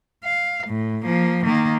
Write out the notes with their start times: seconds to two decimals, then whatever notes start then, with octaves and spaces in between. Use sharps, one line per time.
0.24 F5
0.67 A2
1.03 F3 A#3
1.45 D#3 A#3